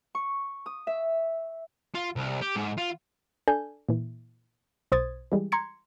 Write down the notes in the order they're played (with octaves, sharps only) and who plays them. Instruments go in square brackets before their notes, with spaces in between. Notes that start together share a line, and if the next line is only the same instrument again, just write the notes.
[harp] C#6
D#6
E5
[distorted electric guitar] F4
C2
G4
G#2
F4
[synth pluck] D4 A4 G#5 G6
A#2 E3
B1 C5 D#6 G#6 A6
E3 G3 G#3
A#5 C6 G#6 C#7